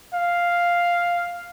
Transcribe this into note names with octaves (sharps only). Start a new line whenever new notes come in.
F5